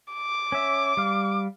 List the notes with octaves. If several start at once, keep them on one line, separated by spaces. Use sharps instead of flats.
D6
C#4 E5
G3 F5